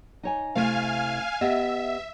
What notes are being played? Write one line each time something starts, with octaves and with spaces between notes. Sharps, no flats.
D#4 C#5 G#5
C3 A3 E4 F5 G#5 F6
B3 G4 D#5 E5